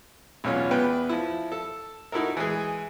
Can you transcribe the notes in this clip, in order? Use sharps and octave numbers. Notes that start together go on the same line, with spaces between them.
B1 E2 C#4 F4
E2 B3 B4 G5
F3 E4
A4
D#4 E4 F#4 A4 A#4
E3 G#3 G#4